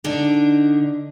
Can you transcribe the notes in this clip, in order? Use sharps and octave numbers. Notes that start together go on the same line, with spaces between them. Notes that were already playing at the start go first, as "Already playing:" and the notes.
D3 D4 D#4